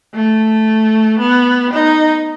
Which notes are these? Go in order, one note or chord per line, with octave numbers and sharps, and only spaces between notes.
A3
B3
D#4